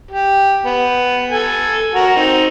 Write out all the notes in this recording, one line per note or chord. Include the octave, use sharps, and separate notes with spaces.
G4
B3
A4 G#5
F#4 A#4
C4 D#4